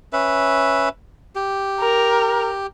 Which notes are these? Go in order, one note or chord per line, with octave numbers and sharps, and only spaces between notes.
C#4 B4 E5
G4
A#4